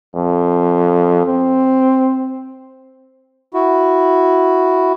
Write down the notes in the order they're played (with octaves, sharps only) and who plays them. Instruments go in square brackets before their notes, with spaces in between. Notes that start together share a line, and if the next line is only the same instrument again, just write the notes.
[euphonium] F2
C4
[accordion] E4 F#4